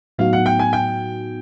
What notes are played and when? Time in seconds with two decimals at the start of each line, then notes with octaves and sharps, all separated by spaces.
0.18 A2 F#3 B3 D#4 F#4 F5
0.33 F#5
0.46 G5
0.59 G#5
0.73 G5